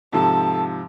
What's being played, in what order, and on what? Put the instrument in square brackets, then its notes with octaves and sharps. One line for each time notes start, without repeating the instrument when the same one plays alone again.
[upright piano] G#2 C3 F3 [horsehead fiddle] A4